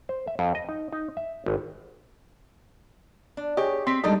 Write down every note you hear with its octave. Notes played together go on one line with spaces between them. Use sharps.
C5
E5
F2
D#5
D#4
D#4
E5
G#1
D4
G4 G#4 C#5 D#5
C4 C6 B6
G3 G#3 D4 D#4 A4 D#5